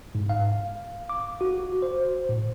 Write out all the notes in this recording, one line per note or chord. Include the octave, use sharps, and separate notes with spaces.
G#2
F5
D6
F#4
C5
A2